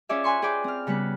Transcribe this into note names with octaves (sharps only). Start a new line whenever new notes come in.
C#4 F4 G#4 C#5 D5 E5
B4 G#5 C6 C#6
G#4 B4 C5 D5 G5
C4 F6
C#3 G3 B3 B4